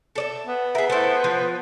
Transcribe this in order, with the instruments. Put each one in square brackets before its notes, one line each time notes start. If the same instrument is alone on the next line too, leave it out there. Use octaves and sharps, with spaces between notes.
[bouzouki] A4 D5 E5
[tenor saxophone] B3
[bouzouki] G#4 A#4 [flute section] E5
[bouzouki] A3 E4 [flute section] C5
[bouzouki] F3